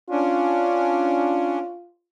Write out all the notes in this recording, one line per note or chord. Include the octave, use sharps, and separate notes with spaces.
C#4 D4 F4